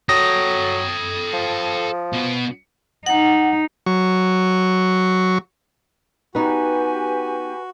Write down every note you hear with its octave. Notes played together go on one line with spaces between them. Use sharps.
F#3 A4 G5 D#6 A#6
F3
B2 B3
D#4 F#5
F#3 C#6
B3 D#4 F#4 G4 B4 G#5